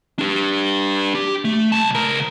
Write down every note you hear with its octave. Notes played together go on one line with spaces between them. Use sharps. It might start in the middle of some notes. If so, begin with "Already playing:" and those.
D4 G4
G4
A3
C2 A5
C#2 A#4